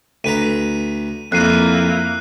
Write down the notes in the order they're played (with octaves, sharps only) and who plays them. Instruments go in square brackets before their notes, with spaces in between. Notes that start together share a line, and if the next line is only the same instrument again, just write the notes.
[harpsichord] D2 B4 A#5 [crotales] D#7
[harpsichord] F2 [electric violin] A#3 E4 [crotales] F#6 C7 D#7